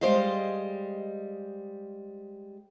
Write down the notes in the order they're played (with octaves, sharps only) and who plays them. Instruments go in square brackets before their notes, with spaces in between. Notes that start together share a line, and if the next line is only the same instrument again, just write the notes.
[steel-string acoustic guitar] G3 G#3 C5 D#5 F5